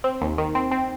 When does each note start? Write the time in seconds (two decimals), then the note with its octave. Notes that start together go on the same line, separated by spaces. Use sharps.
0.04 C4
0.21 D#2
0.38 D#3
0.55 C4
0.71 C4